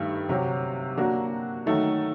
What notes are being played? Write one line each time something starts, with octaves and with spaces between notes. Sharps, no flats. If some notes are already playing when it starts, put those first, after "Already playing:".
Already playing: G2 D#3 A3
C3 F#3 C4 G4
F#3 A#3 D4 F#4
D#3 F#3 A3